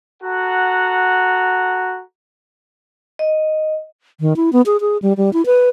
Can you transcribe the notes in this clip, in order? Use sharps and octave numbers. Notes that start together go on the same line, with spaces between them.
F#4 A4 F#5 A#5
D#5
D#3
E4
B3
G#4
G#4
G3
G3
E4
B4